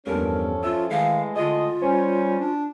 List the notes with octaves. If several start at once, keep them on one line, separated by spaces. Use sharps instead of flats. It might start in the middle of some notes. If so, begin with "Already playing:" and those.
E2 G2 F3 C#4 A4 A#4
F4 E5 E6
A2 D#3 E3 G#3 F5
A2 D3 G#3 F4 D#5
G3 C#4 C5
D4